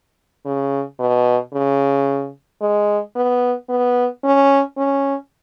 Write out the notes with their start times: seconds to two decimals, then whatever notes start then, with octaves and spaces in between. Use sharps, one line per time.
0.45 C#3
1.00 B2
1.53 C#3
2.62 G#3
3.16 B3
3.69 B3
4.24 C#4
4.78 C#4